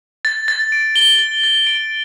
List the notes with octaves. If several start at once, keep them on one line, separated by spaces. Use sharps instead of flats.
A6
A6
D7
G7
A6
A6
D7